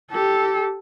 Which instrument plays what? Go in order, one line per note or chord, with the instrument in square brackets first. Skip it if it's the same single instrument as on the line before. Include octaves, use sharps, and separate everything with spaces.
[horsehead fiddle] G4 A4